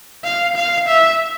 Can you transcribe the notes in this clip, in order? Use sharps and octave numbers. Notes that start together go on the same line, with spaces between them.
F5
F5
E5